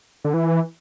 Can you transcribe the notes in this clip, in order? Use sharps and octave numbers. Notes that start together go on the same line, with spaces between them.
D3
E3